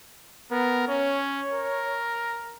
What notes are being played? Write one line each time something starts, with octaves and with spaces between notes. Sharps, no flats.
B3 A#4
C#4 C#5
A#4